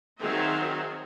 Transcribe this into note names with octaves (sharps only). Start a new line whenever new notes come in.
D#3 F#3 C4 G#4 E5